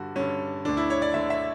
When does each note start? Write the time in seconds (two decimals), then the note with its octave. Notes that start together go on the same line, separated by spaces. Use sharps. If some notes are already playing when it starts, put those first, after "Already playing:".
Already playing: G2 D3 F#4
0.16 G2 D3 C#4
0.65 D2 D3 D4
0.77 E4
0.90 C#5
1.02 D5
1.14 D2 D3 E5
1.30 E5